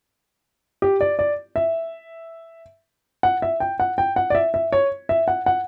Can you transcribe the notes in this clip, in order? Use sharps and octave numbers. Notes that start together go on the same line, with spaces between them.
G4
D5
D5
E5
F#5
E5
G5
F#5
G5
F#5
D5
E5
E5
C#5
E5
F#5
F#5